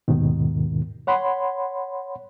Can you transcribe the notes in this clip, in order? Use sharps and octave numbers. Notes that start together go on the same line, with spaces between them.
D#2 G#2 B2 D#3
C#5 F#5 B5 C6